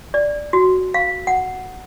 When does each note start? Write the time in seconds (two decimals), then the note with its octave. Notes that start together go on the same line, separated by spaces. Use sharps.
0.14 D5
0.53 F#4
0.94 F5
1.27 F#5